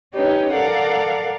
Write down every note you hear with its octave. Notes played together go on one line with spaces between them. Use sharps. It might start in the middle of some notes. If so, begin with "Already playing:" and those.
C#4 D#4 G4 B4 C#5
A4 A#4 D5 F5 F#5